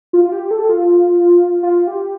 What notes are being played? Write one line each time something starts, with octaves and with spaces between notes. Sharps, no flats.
F4
F4
G4
A4
F4
F4
G4